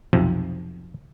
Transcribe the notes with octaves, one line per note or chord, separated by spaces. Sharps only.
B1 F2 C3 F3